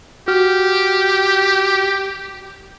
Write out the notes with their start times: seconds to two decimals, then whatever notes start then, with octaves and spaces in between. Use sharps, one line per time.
0.28 F#4 G4 F6